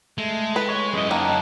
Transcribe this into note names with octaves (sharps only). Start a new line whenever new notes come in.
G#3 A3
B4
C#5
F#2 G#3 E4 D#5
D#3 A#3 C#4 A5 F#6